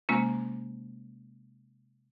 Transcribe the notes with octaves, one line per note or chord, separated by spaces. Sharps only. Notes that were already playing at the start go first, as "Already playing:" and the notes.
C3 G#3 A#3 C#4 F4